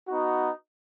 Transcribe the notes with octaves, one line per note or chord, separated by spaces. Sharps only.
B3 D#4 F#4